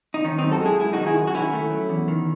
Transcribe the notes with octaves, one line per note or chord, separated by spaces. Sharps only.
D#4
D#3 C#4
F#2 C4 D#4
F#4 A4
G#3 E4 G#4
F#2 E4 G#4
D#3 D#4 F#4
E4 G#4
F#2
F#4
D#3 C#4 E4
A3
F#3
E2
D#3